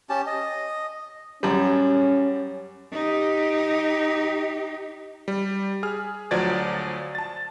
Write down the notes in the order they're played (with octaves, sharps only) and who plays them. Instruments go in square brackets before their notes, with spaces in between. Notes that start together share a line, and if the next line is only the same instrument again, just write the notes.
[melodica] C#4 G4 A5
D#5
[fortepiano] F#2 G3 [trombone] C#4
[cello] D#4 G4
[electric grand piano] G3
G#4 F6
D2 F3 F#3 D5 G#6 A6
A5 A6